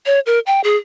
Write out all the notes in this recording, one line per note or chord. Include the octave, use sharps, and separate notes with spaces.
C#5
A#4
G5
G#4